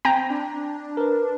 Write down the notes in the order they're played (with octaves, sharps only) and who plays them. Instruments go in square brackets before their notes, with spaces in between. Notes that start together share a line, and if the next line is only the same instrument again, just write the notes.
[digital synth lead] C4 [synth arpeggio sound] G5 A#5
[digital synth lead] D4
[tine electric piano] A#4 B4